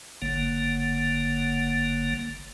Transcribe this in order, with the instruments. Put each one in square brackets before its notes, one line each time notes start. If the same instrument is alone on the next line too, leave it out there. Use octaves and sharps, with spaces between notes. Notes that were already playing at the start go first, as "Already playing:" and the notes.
[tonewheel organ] F#1 D3 A#3